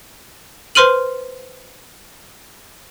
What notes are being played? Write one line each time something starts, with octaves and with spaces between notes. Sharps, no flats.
B4 C5 C6 F6 D#7 F#7